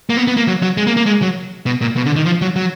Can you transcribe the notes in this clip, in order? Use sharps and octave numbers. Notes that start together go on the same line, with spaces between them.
A#3
B3
B3
A#3
F#3
F#3
G#3
A#3
A#3
G#3
F#3
B2
A#2
B2
D3
D#3
F3
F#3
F#3